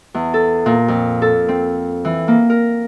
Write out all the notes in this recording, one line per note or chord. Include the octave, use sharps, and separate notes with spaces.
E2
A4
A#2
F2
A4
C4
E3
A#3
A#4